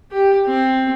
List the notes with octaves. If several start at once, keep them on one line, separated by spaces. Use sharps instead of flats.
G4
C4